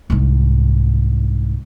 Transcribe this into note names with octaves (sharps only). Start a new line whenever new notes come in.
C2 G#2